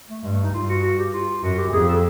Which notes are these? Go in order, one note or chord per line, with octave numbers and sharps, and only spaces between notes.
A3
G2 G#3
A3
D#4
G2 F4
F#4
F#4
G4
F4
F#2 F#4
G4
F2 G#4
A4